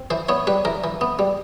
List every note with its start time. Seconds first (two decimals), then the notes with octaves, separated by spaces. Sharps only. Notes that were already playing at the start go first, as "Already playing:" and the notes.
Already playing: C4
0.10 E3 C5
0.29 B3 C#5
0.47 G3 B4
0.65 E3 A#4
0.84 E3
1.01 B3
1.19 G3